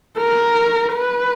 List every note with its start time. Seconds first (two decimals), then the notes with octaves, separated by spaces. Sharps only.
0.18 A#4
0.93 B4